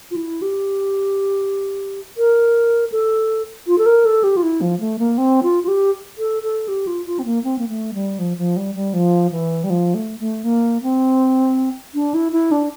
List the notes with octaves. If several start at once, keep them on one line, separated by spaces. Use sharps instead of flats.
F4
E4
G4
A#4
A4
F4
A4
A#4
A4
G4
F4
E4
F3
A3
A#3
C4
F4
F4
G4
A4
A4
G4
F4
F4
C4
A#3
C4
A#3
A3
G3
F3
F3
G3
G3
F3
E3
G3
F3
A3
A3
A#3
C4
D4
E4
E4
D4